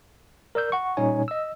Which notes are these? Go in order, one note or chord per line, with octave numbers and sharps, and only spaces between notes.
A#4 D5 E6 G6
F#5 C#6
A#2 G3 C#4 D#4 C#5 G#5
D#5 E6